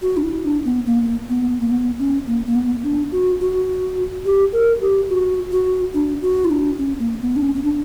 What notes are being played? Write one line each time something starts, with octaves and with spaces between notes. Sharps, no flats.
F#4
D4
E4
D4
B3
A#3
B3
A#3
B3
C#4
A#3
A#3
B3
D4
F#4
F#4
G4
A#4
G4
F#4
F#4
D4
F#4
E4
D4
C#4
A#3
B3
D4
C#4
C#4
D4